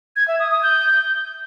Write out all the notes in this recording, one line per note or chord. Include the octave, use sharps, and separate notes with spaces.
G#6
E5
D#6
D#6
G6